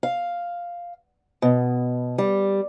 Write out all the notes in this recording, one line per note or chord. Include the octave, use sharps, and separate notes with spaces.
F5
B2
G3